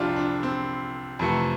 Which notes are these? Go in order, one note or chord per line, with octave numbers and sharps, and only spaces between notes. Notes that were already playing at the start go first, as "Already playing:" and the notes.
Already playing: C2 C3 F3 D4 E4 F4 G4
D4
C4
F2 C3 E3 A3